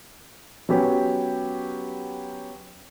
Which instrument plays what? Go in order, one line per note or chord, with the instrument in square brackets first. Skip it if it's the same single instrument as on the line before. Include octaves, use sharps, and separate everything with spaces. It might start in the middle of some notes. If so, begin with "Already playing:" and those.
[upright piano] F#3 B3 C#4 G4